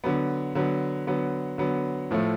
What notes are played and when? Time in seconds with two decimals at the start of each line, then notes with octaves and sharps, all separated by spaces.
0.04 D3 F#3 B3
0.55 D3 F#3 B3
1.07 D3 F#3 B3
1.58 D3 F#3 B3
2.11 A2 F3 A3